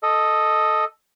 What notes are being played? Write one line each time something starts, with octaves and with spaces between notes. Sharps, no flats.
A4 D#5